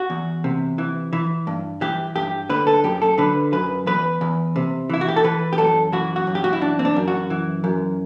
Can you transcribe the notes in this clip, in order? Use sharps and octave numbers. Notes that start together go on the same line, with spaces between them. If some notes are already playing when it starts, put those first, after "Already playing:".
Already playing: F#4
E2
C3
E3
E3
G2
E3 G4
G2 G4
D3 B4
A4
F#2 G4
A4
D3 B4
F#2 B4
E2 B4
E2
C3
E3 E4
F#4
G4
A4
E3 B4
G4
F#2 A4
E3 F#4
F#4
F#2
G4
F#4
E4
E3 D4
C4
D4
F#2
F#4
E3
F#2